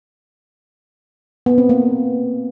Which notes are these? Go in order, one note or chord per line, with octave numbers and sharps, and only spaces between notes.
B3
C4
A#3